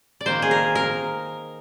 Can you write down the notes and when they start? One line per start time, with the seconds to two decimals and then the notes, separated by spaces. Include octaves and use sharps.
0.21 D5
0.26 D#3 A#3 C5
0.42 G#4
0.51 A#4
0.75 A#4